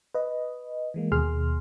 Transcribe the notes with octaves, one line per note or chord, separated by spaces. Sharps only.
B4 D#5
E3 G#3 A#3
D#2 B2 G#4 C6 F6